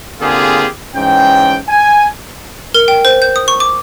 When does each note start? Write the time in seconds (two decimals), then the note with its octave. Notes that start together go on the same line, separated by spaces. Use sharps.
0.21 D3 A#3 C4 F4 G4 G#4
0.96 G#2 E3 C#4 G5
1.69 G#5
2.75 A#4
2.88 G5
3.05 C5
3.22 G6
3.36 D#6
3.48 C#6
3.60 D6